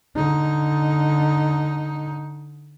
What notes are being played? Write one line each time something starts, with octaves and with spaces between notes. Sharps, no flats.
D3 D#4